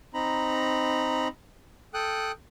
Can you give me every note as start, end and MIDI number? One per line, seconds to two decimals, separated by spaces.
0.14 1.28 60
0.14 1.28 63
0.14 1.28 82
0.14 1.28 83
1.94 2.32 69
1.94 2.32 79
1.94 2.32 87
1.94 2.32 90